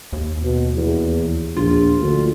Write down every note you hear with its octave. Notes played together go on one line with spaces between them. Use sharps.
D#2
B2
E2
A#1 F4
D2